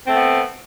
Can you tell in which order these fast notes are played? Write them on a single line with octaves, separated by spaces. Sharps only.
C4 A3 B3